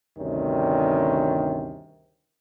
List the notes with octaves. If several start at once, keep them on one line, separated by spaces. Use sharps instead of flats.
D2 G2 C3 D#3 C#4